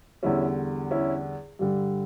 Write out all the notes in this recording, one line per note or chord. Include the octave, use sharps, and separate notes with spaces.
E2 D3 G3 C#4 E4
C#4 E4
G2 D3 G3